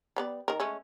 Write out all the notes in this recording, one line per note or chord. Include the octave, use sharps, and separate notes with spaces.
G3 B3 D5
D#3 A#4
G#3 A3 C#4